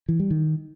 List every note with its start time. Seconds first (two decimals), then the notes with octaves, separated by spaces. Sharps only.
0.09 E3
0.20 G3
0.31 D#3